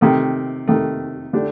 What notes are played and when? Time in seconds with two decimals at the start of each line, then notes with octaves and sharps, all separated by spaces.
0.01 C3 D#3 A3
0.67 C3 D#3 A3
1.33 D3 A3 D4 G4